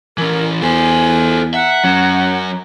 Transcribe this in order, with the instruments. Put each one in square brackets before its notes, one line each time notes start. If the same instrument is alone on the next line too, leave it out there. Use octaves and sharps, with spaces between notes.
[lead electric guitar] E3 C#4 [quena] A#4
[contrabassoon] E2 [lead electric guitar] A4 C5 [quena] G#5
[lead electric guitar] E5 [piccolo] F#5 [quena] A#5
[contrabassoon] F#2 [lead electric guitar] F#3 C#4